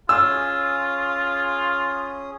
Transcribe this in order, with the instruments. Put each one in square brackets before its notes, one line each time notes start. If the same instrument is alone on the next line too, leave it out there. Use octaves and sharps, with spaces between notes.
[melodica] C#4 G#4 D#6 [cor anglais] F4 [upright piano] E6